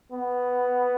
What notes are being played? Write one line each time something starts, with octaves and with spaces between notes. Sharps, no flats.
B3